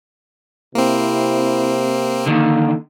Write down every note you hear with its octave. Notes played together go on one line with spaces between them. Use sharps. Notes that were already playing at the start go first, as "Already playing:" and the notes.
C3 A#3 C4 E4
D3 D#3 A#3